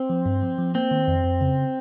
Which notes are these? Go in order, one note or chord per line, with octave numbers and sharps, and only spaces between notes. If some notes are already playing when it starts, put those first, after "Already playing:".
Already playing: C4
F3
G2
F3
F3
A#3 C4
D#3
F2
F2
C#3